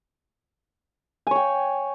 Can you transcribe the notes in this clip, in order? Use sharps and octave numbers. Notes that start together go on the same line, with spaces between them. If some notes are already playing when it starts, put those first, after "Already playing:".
C#5 G5 G#5